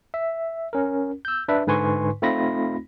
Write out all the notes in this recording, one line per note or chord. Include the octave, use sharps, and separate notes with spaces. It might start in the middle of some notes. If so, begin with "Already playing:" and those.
E5
C#4 A#4
E6 G6
D4 B4 E5
G#2 D3 B4 G#5 C6 C#6
A3 C4 D#4 F4 B5 A#6